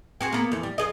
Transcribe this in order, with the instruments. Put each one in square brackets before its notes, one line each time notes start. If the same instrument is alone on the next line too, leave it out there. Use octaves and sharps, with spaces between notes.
[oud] C4 F#4 G#4
A#3 B3
F2 E3
G3
F2 G#4 D#5